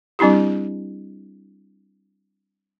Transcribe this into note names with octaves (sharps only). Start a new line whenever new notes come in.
G3 C4 D4 E4 G4